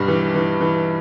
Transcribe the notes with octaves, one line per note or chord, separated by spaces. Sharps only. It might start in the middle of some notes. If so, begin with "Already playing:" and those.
Already playing: B1 G2 G3
E3
E3
E3